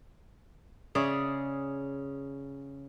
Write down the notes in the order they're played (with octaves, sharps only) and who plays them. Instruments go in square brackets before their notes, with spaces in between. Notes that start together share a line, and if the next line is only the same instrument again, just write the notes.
[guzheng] C#3 G#4 D5 E5